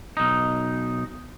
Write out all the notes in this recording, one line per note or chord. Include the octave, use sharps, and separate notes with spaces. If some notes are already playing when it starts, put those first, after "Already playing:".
B1 D#4